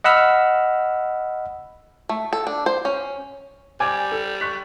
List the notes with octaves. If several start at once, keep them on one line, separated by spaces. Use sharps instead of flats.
D#5 F#5 B5 E6 F6
A3
A4
D4
C5
C#4
G3 G#5 D6 G#6
A4
C#6 F#6 B6